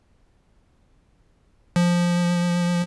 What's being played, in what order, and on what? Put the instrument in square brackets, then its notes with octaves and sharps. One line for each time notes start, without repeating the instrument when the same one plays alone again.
[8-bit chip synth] F3